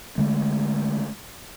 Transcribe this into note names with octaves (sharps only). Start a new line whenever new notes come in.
D3 G#3 A3